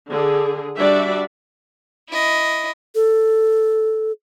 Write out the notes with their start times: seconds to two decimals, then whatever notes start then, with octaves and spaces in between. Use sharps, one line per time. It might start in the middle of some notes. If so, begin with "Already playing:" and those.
0.10 D3 G#4
0.79 G3 D4 F#4 D5 E5
2.10 E4 D#5
2.95 A4